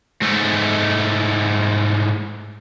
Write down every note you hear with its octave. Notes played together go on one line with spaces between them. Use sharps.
G#2 A3